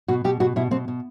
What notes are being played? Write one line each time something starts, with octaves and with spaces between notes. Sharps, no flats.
B2 F#4
B2 G4
B2 F#4
B2 E4
B2 C4
B2